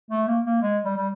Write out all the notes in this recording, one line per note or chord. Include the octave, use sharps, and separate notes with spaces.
A3
A#3
A#3
G#3
G3
G3